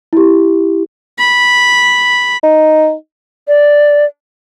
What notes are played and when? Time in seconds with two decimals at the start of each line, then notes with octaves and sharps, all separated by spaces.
0.13 E4 G4
1.19 B5
2.44 D#4
3.48 D5